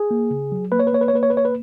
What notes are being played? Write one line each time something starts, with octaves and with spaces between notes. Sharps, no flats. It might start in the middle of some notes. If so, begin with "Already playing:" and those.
Already playing: G#4
A#3
C#3
F#3
A#3 B4
C#5
B4
A#3 C#5
B4
C#5
A#3 B4
C#5
B4
A#3 C#5
B4